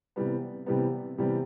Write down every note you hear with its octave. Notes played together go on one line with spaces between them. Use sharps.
C3 E3 G3 B3
C3 E3 G3 B3
C3 E3 G3 B3